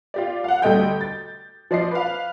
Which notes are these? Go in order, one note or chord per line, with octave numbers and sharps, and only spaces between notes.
F4 G4 D5
F5 F#5
D2 G3 A4 D#5 G5 G6
A6
F3 D5 D#5 C7
B4 F5